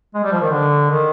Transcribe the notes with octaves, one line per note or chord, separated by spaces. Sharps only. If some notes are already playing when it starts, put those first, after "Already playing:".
G#3
G3
F3
D#3
D3
D#3